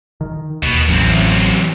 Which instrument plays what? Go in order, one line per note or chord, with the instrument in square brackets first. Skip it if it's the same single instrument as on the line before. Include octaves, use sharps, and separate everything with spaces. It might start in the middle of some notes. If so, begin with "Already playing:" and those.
[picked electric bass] D#3
[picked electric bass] D#2 [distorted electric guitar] B2
[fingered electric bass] A1 [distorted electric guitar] F#2 C4
[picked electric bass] E3